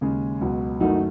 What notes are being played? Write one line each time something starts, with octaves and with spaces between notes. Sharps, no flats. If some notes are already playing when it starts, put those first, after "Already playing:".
D#2 C#3 G#3 C#4
C#2 B2 F#3
F#1 F#2 D#3 F#3 A3 D#4 F#4